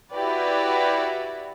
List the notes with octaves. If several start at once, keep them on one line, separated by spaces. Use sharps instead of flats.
E4 F#4 G4 B4 D5